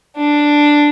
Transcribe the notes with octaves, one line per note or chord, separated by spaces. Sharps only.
D4